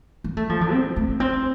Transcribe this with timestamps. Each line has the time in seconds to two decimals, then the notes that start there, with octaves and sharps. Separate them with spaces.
0.24 A#3
0.37 A3
0.49 F3
0.61 D3
0.72 C4
0.96 A3
1.09 A#3
1.20 C4